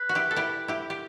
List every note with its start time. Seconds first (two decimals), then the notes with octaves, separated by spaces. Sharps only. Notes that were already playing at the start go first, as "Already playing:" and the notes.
Already playing: B4
0.09 F#4
0.15 E4 G4
0.31 A4
0.36 E4 G4
0.68 E4 G4
0.90 G4